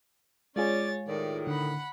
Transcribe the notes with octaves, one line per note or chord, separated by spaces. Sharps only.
G#3 C#4 F4 G#4 C#5 D5 A6
A2 D#3 D5
D3 F#5 B5